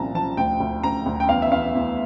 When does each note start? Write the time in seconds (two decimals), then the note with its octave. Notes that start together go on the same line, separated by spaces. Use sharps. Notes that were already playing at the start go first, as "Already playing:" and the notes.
Already playing: C2 A#2 F3 A5 A#5
0.15 F3 A5
0.37 D2 G5
0.60 D2
0.84 D2 A#5
1.06 D2
1.20 G5
1.29 E2 F5
1.42 E5
1.52 E2 F5
1.75 E2